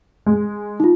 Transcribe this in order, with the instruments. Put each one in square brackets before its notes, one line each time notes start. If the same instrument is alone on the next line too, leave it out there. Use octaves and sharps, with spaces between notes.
[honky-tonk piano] G#3
[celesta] D#4 F4